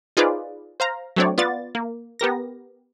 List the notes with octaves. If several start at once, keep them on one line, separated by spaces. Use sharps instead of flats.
D#4 F4 G#4 B4 C5 D5
C5 F5 A#5
F#3 A3 C4 D4 C#5 D5
B3 F4 D5 A6
A#3
B3 G4 A#4 A#6